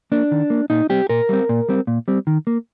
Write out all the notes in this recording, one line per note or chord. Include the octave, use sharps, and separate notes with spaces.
A#3 D4
D#3
A#3
A#2 D#4
G3 C4 G4
A#2 A#4
G3 C4
A#2
G3 C4
A#2
G3 C4
D#3
A#3